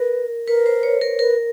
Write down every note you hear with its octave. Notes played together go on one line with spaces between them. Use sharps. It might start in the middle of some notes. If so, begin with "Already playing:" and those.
Already playing: A#4 B4
A#4 B4
C5
C#5
A#4
A#4 B4